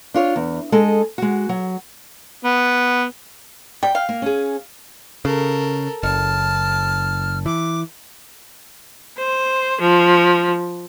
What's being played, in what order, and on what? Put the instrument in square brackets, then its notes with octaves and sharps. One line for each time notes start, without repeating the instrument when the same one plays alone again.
[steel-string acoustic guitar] D4 F4 C#5
E2
G#3 A4 D#5
G#3 F#4
F#3
[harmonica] B3
[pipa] G3 [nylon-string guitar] G5
[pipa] F5
[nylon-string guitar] A#3
C#4 G#4
[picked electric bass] C#3 [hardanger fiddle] A4 A#4
[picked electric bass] F#1 [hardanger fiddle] A5 [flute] F6
[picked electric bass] E3 [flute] D6
[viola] C5
F3